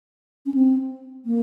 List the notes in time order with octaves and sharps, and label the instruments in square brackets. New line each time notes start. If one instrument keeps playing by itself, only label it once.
[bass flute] C#4
C4
A#3